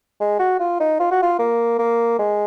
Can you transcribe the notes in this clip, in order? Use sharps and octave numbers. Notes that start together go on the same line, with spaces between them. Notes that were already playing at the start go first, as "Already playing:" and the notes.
G#3
F#4
F4
D#4
F4
F#4
F4
A#3
A#3
G#3